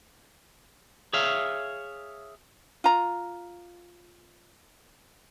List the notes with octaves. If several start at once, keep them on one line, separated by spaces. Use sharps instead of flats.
G#4 C#5 E5 F5
F4 A#5